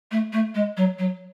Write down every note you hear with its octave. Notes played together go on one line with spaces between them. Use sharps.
A3
A3
G#3
F#3
F#3